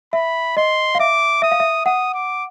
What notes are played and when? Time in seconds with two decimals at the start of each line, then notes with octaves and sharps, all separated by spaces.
0.13 E5 B5
0.57 D#5 C6
0.95 F5
1.00 E5 D6
1.42 E5 D#6
1.52 F5
1.60 E5
1.85 F#5 D#6
2.14 D6